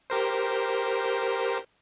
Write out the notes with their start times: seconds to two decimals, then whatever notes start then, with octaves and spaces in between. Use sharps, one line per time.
0.10 G4 A#4 C5